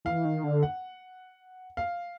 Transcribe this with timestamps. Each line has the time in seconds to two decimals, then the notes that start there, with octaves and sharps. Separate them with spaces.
0.05 E3 F5
0.25 D#3
0.44 D3
0.63 F#5
1.77 F5